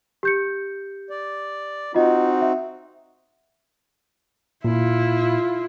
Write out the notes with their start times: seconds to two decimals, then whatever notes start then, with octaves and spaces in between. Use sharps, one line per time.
0.23 G4 G6 C#7
1.10 D5
1.94 C4 D#4 F4 F#4 D#5
2.41 E5
4.65 A#2 E4 F4